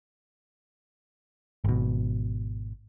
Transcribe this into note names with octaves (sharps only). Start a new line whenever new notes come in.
G#1 B2